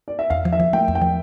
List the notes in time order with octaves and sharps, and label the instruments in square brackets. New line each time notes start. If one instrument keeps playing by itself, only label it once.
[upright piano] D5
E5
[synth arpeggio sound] E2 [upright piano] F5
[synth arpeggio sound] F3
[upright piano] E5
[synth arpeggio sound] F3
[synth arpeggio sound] A3 [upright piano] G5
[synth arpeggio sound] E2
[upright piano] G5
[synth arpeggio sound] F3